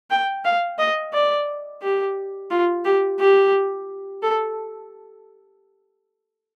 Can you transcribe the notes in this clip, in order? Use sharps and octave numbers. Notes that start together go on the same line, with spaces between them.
G5
F5
D#5
D5
G4
F4
G4
G4
A4